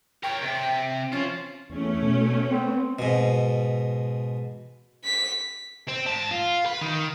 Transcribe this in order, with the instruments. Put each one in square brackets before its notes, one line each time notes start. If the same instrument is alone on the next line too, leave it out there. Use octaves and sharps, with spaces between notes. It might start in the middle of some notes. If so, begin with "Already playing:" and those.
[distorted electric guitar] A#4 C#5 [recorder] G5
[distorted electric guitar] C3
[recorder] C#4 [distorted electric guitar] F4 C5
[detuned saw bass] E2 [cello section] A3 C#4
[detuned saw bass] B2
[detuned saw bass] B3 [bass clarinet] C4
[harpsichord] G#2 B2
[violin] B6
[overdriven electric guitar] C4
G#2 A5
F4
B4
D#3